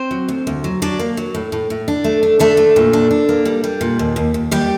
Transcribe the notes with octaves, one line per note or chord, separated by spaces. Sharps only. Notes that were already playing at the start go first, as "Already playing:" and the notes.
Already playing: C4 C5
F#3
D2
D2
F#3
F#3 D4 D5
A#3
F#3
A2
A2
A2
D4
A3
D4
A3 D4 A4
A3
A#2
D4
D4
A#3
G3
G3
A#2
D#2
D#2
D#2
D#2 G3 G4